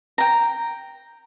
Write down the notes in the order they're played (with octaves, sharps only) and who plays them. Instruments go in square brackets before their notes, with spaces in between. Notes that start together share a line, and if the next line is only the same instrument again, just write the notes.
[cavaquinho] G5 A#5